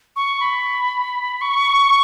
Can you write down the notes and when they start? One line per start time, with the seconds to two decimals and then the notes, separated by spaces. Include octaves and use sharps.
0.16 C#6
0.40 B5
1.41 C#6